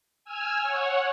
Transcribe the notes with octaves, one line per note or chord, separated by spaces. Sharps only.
G#5 E6 F6 G#6
C#5 F#5